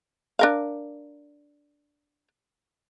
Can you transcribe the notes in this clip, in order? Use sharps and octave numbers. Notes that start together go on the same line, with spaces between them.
D4 A#4 F5